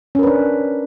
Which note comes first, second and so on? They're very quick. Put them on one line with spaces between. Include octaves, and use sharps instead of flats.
C#4 A#4 B4 D4